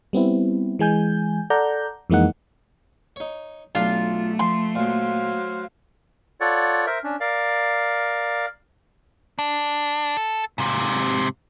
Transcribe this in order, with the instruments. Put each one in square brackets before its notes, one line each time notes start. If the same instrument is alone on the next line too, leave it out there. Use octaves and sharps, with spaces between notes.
[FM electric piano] G3 B3 C4 E4
E3 G#3 G#5 G6
A4 D5 F#5 A#5 G6
F2 E3 G#3 A#3 D#4 F#5
[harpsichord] D#4 C#5
[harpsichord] B1 D4 [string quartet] A3 [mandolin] F4
[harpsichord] F3 [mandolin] C6
[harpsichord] A#2 [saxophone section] F#3 C5 F5
[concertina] F4 A4 C#5 D5 F#5
A#4 C5 E5
C#4 D4
A#4 D5 F5
[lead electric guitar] D4
A4
G#2 C3